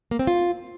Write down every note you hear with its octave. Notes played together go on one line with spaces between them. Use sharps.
A#3
C4
F4